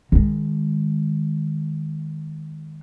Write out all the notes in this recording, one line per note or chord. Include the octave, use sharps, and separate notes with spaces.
D#3 G#3